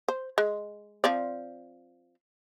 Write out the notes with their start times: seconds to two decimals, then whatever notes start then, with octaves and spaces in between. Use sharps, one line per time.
0.08 C5
0.38 G#3
1.04 F3 C4 D5